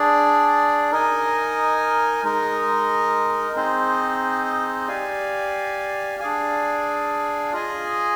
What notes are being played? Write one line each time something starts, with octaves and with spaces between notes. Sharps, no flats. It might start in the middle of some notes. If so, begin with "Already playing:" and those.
Already playing: D4 G#4 D5
D#4 A#4 D#5 G#5
G#3 D#4 A#4 D#5
C4 D#4 G#4 C5 D#5
G4 D5 F5 G#5
D4 G#4 D5 F5 G#5
F4 G#4 D#5 G#5